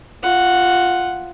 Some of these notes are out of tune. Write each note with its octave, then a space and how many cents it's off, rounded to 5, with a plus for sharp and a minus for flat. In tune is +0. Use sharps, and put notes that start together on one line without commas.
F4 +0 F#5 +0